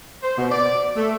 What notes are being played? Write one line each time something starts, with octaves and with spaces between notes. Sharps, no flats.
C5
B2
D5
A3